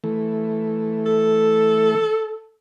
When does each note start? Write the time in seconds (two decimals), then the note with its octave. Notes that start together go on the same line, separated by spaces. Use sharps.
0.04 E3 A3
1.06 A4